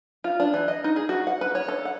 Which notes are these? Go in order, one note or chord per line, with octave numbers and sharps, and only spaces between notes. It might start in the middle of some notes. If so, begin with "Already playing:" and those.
F4
D4
E3
D#5
D#4
G#4
F#4
F#5
B4
C#5
A4
F#5